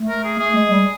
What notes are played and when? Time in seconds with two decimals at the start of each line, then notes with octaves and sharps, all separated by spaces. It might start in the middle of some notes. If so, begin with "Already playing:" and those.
Already playing: A3
0.09 A#4
0.24 G#4
0.39 A3 G#4
0.55 G#3
0.70 G3